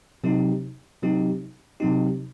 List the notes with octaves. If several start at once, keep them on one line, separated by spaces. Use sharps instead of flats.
C3 F#3 C4 D#4 G4
C3 F#3 C4 D#4 G4
C3 F#3 C4 D#4 G4